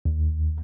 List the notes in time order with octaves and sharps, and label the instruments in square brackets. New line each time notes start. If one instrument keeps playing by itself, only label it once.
[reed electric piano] D#2